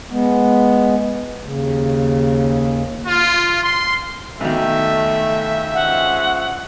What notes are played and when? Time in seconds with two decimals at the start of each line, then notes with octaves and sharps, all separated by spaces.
0.10 G#3 B3
1.43 D#2 C#3
3.07 F4
3.63 C6
4.40 B1 D#3 A3 E5
5.74 F3 G#3 C#4 F#5